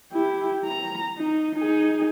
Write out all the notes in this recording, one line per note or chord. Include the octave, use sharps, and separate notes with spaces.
E4 G4
A#5
D#4
D#4 G#4